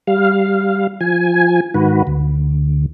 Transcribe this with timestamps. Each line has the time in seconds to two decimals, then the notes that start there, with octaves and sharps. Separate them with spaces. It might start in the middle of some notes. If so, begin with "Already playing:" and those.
0.07 G3 F5
1.01 F3 G#5
1.74 G#2 D#3 F#4 B4
2.07 D2